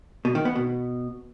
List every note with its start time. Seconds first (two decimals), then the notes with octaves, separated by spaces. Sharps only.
0.25 B2
0.35 D#3
0.45 B3
0.56 B2